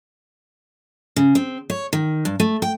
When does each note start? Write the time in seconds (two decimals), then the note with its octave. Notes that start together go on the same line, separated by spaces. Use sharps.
1.16 C#3
1.35 C4
1.70 C#5
1.93 D#3
2.25 G2
2.40 A3
2.62 G5